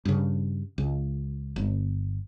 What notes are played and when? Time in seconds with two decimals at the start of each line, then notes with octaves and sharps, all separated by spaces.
0.05 G2 C#3
0.78 C#2
1.56 G1